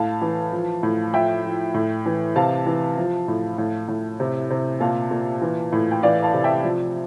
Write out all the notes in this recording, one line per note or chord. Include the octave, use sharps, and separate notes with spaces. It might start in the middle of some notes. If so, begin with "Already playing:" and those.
Already playing: A2 F5 A5
E3
F3
A2
F3 E5 G5
F3
A2
E3
C3 F5 A5
E3
F3
A2
A2
A2
C3
C3
A#2 F5 A5
A#2
E3
A2
G5
E3 D5 F5
F5 A5
C3
E5 G5
F3